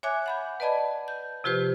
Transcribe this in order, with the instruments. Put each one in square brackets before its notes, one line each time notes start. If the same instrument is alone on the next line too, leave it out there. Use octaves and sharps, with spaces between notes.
[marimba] C#5 E5 G#5 D6 F#6 G#6
F#5 B5 G6
B4 D5 D#5 A5 B5 G#6
G6
C3 F3 F4 G4 B4 C5